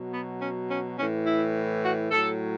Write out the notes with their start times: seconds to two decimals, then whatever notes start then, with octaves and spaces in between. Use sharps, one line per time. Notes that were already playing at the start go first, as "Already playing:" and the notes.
Already playing: B2 F#3
0.13 B3
0.42 C#4
0.71 C#4
0.98 A2 E3 C#4
1.26 E4
1.83 F#4
2.11 A2 F#3 A4